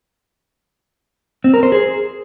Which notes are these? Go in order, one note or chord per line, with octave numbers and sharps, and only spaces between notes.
C4
A#4
C5
G#4